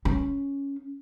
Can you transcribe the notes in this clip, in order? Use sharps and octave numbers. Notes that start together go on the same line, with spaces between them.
C#4